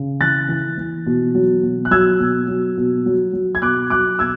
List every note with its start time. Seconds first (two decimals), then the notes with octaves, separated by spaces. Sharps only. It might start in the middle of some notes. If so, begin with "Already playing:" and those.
Already playing: C#3
0.20 E3 F#6 A6
0.48 E3
0.78 E3
1.06 B2
1.35 F#3
1.63 B2
1.85 F#6
1.91 F#3 E6 G#6
2.20 B2
2.48 F#3
2.77 B2
3.06 F#3
3.33 F#3
3.55 G#6
3.62 B2 D6 F#6
3.90 F#3 D6 F#6
4.19 B2 E6 G#6